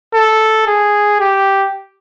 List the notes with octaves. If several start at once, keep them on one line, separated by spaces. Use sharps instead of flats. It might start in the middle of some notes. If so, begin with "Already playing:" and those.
A4
G#4
G4